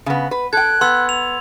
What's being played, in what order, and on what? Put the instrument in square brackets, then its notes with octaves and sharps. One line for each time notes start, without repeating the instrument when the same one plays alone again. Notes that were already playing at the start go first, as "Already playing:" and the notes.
[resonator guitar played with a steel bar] C#3 B3
B4
[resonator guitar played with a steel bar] A4 G5 [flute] F#6 [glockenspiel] G#6
[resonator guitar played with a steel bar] B3 [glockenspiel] C6 E6
[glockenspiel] F7